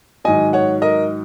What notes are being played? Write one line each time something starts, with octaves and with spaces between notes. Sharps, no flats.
G#2 D#3 F#3 D#5 G#5
C#5 F#5
A#4 D#5